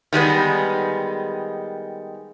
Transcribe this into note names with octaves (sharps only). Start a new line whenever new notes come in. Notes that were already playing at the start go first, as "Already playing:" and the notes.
D#3 G3 G#3 B3